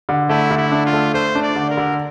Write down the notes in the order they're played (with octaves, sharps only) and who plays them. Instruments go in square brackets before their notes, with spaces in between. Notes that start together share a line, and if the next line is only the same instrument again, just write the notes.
[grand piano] D3
[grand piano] A3 [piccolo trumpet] E4
[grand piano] D3
[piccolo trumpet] E4
[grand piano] D4
[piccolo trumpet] F4
[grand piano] A3
[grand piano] A3 [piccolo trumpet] C5
[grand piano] D4
[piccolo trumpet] D5
[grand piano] D3
[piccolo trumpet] A#4
[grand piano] D3